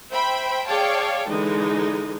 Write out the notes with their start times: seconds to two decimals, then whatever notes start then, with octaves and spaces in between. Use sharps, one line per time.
0.11 C5 E5 G5 B5
0.67 G#4 C#5 D5 F5 G5 A5
1.27 D3 E3 G#3 D#4